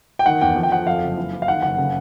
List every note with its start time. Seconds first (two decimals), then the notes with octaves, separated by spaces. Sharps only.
0.19 G5
0.26 D#3 F#5
0.41 E2 G5
0.56 F3
0.63 G5
0.72 F3 F#5
0.86 F2 F5
1.02 F#1
1.17 E3
1.33 E3
1.42 F5
1.48 D#3 F#5
1.62 F#1 F#5
1.77 C#3